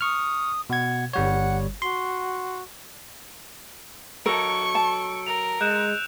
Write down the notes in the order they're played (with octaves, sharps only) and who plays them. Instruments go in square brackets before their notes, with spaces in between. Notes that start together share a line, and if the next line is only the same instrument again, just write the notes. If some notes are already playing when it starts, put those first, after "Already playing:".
[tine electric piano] C#6 F6 [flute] D#6
[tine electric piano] B2 G#6 [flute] F#5
[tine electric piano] G1 G3 C#5 [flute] F#5
[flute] F#4 [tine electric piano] C6
[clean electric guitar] F#3 A4 [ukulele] A#4 [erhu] C#6 [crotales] E6 C#7 D7
[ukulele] A5
[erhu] A#4 [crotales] F7
[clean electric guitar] G#3 [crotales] F#6 G6 E7